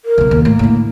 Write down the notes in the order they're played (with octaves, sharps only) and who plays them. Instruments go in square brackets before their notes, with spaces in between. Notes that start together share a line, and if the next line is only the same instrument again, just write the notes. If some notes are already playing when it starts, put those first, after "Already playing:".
[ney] A#4
[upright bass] B1 C#3
D#2
[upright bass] A2 [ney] A#3
[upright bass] A2 D3